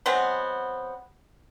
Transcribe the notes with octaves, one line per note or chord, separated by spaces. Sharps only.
F#3 G#3 B3 C4